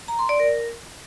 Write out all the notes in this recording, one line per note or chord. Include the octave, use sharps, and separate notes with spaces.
A#5
C6
D5
A#4